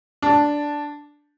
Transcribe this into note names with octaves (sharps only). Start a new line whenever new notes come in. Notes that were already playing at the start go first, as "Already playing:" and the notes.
D4